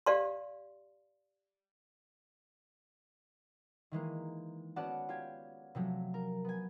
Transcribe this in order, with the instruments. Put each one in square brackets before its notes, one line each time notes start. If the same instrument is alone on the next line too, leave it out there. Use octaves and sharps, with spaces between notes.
[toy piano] G4 D5 F5 C6
[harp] D#3 E3 G#3 A#3
B3 C#4 F#4 D5 F#5 A5
F4 G4 G#6
C3 F3 F#3 A3
A#4
B3 G#5